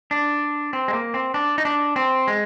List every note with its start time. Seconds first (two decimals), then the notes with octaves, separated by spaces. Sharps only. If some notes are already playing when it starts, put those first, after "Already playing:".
0.11 D4
0.73 C4
0.88 G#3
0.93 A#3
1.14 C4
1.34 D4
1.58 D#4
1.65 D4
1.96 C4
2.28 G#3